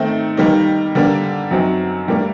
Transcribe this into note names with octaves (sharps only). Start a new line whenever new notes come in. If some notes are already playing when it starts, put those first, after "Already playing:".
Already playing: D#3 A3 C4 D#4
D#3 G3 A#3 D#4
D3 G3 A#3 D4
F#2 F#3 C4 D#4
A2 G3 A#3 D4